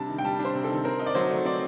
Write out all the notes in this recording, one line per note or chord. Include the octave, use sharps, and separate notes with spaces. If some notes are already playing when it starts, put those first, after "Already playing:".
Already playing: C3 G3 D4 A5
D#3
G5
G3 A5
D4
C5
C3
A4
D#3
C4 A#4
D#4
D5
F#3 C5
A3
C4 D5